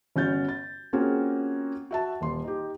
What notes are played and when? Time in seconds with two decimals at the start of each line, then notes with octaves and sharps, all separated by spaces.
0.16 G1 C#4 F#4 G6 A6
0.49 A6
0.93 A#3 C4 C#4 F4 F#4 G#4
1.91 F#4 E5 A5
2.21 D#1 C6
2.44 D#4 G4